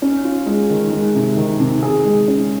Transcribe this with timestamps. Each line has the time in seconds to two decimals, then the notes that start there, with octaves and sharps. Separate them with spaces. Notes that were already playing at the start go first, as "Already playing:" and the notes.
0.02 C#4
0.24 F4
0.46 G#3
0.70 D#3
0.91 G#3
1.15 C3
1.37 D#3
1.60 C3
1.83 G#4
2.05 G#3
2.28 C#4